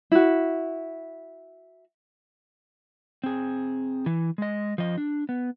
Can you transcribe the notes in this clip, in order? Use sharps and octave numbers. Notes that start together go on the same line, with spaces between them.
E4 F#4
C4 G#4
E3
G#3 D#5
F3 D#5
D4
B3